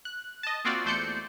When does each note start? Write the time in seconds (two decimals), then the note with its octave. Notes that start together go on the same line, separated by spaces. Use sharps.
0.05 F#6
0.43 D#5 A5
0.64 A#3 C4 F4 F#4 D5
0.85 E2 A3 C5 D5 G6 C#7